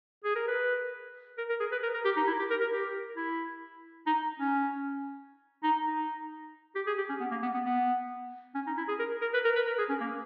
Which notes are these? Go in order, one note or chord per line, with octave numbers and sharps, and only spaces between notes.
G#4
A#4
B4
A#4
A#4
G#4
B4
A#4
A#4
G4
D#4
E4
G4
A#4
A#4
G4
E4
D#4
C#4
D#4
D#4
G4
G#4
G4
C#4
B3
A#3
B3
B3
B3
C#4
D#4
E4
G#4
A#4
A#4
B4
A#4
B4
A#4
G#4
C#4
A#3